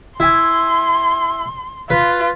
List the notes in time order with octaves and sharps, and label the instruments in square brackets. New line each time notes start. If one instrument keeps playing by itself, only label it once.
[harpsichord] E4 G#5 [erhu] C6
[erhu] F4 [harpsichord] B4